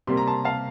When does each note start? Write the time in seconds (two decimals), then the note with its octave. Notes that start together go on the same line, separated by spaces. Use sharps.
0.07 C3 G3 A#3 C6
0.17 A#5
0.27 A5 C6
0.45 F5 A5